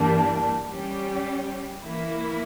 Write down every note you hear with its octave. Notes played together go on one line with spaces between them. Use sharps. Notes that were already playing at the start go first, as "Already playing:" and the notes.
Already playing: G2 E3 G3 A#3 D4
G3 C#4 G4
E3 A#3 E4